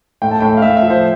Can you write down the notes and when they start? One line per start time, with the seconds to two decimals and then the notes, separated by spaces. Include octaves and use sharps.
0.22 A2 G5
0.31 A5
0.40 A2 G5
0.57 F5
0.62 A2 E5
0.77 E5
0.82 F3
0.90 C5